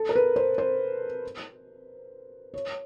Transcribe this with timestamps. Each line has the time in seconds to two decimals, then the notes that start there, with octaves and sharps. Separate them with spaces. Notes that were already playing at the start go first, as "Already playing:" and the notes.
Already playing: A4
0.09 A#4
0.16 B4
0.36 C5
0.58 C5
2.54 C#5